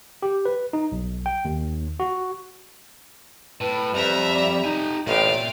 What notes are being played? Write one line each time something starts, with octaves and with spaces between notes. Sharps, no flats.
G4
B4
D#4
B1
G5
D#2
F#4
A2 B4
F2 G3 E5 A#5
D5
D#4 G4 G#5
A1 A#2 E5 F5 G5